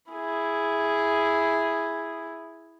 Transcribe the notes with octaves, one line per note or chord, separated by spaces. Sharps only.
E4 G#4